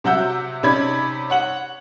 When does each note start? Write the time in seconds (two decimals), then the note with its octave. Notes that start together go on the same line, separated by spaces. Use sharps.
0.04 C3 F#3 E5 F#5 E6 G6
0.63 C3 C#4 D#4 D5 B5 G#6
1.30 C#5 F#5 F#7